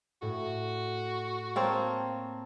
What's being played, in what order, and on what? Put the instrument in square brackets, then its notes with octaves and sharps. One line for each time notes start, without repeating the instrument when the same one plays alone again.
[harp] A2 [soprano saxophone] F#4
[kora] A#3 C4 C#5 [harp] A5